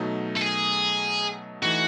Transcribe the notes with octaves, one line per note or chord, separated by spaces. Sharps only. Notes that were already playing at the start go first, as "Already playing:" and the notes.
Already playing: B2 F#3 A3 D#4
A4
G#4
E3 A3 D#4 F#4